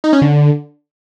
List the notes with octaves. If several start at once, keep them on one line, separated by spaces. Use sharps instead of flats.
D#4
C#4
D3